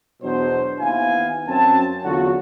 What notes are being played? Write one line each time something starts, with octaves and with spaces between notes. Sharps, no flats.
E2 B2 F#3 D4 C5
D#2 B3 E4 F5 G#5
F#2 C4 A5
E2 D3 F#3 F4 F#4